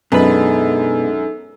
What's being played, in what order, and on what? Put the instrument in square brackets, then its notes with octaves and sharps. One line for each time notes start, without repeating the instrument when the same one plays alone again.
[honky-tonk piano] F#2 [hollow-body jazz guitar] B2 B4 [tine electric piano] G#3 B3 D4 [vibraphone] D#4 A4